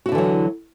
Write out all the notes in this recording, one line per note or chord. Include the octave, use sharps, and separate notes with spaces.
D3 E3 F#3 E4 F#4